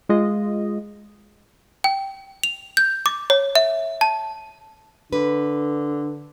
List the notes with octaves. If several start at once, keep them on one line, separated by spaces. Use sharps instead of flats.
G#3 F4 D#5
G5
F7
G6
D6
C#5
E5
A5
D3 B4